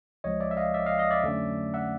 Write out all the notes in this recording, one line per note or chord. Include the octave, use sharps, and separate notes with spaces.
C#2 C#3 F3 G#3 C#5 D#5
D5 E5
E5
D#5 F5
D5 E5
D#5 F5
D#5 F5
D5 E5
F2 D3 F#3 A3 C#4
E5 F#5